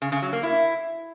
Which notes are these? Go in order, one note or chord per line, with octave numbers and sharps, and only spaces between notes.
C#3
C#3
F#3
A#3
E4